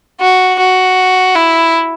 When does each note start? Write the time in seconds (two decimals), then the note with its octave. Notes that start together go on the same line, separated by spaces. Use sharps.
0.21 F#4
0.59 F#4
1.35 E4